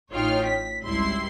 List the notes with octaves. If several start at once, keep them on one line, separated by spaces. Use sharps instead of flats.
A1 D#4 F4 C#5 G5 F6
B6
G#1 C#2 G3 E4 C6 C7